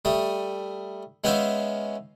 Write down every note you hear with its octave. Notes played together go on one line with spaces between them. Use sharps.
G3 A3 D#6
G#3 B3 C#4 C5 E5 F5